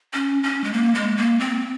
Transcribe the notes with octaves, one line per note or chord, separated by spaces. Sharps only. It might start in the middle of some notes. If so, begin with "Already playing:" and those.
C#4
C#4
G#3
A#3
G#3
A#3
C4